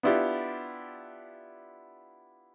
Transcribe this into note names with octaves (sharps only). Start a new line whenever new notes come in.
B3 D4 E4 F4 G4